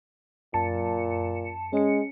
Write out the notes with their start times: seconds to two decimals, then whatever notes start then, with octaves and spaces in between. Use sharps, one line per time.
0.54 F#2 A#2 A5 C#7
1.73 G#3 C#4 C#7